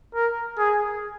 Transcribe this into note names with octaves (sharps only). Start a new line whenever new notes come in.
A#4
G#4